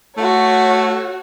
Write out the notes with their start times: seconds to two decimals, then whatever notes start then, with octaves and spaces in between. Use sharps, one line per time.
0.17 A3 F#4 C#5